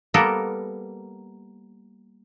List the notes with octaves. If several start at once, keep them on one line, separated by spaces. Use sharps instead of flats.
G3 A#3 B3 A4 A#4